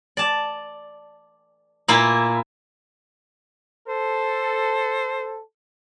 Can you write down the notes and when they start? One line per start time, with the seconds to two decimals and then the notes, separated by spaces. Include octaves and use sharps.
0.17 D5 A5
1.88 A#2 A#3 E4
3.88 A4 C5